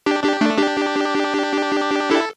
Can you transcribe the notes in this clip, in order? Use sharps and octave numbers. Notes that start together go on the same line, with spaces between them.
D4 G4
D4 G4
A3 D4
D4 G4
E4 A4